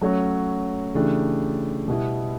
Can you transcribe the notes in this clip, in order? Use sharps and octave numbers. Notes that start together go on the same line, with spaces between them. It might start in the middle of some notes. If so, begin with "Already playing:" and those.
F#3 A3 C#4 F#4 C#5
C#3 E3 A3 D4 G4
B2 G3 B3 E4